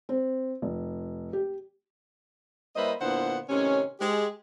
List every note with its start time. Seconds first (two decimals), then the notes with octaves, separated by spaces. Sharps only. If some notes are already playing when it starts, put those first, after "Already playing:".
0.09 C4
0.62 F1
1.33 G4
2.76 G3 A#3 E4 B4 C5 D#5
3.01 A#2 D3 B3 E4 C5 F#5
3.49 A2 C3 D#3 C#4
4.00 G#3 G4